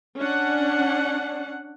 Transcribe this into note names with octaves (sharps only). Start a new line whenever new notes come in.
C#4 D4 F#5